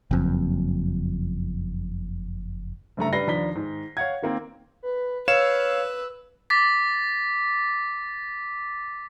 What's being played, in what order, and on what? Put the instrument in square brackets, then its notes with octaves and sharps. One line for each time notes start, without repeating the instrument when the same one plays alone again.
[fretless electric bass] F#1 F2
[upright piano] F#1 G2 A3 A#5
G3 D4 B4 A#6 C7 G7
D#2 F3 D4 A#5 B6 G7
G#2 D#3
C#5 F5 F#5 G#6
D#3 A#3 C4
[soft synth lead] B4
[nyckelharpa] B4 [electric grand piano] C#5 F5 E7 [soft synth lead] E6
[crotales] D6 A6 B6